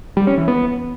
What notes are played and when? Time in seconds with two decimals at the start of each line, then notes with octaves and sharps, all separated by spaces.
0.17 G3
0.27 C#4
0.37 E3
0.48 B3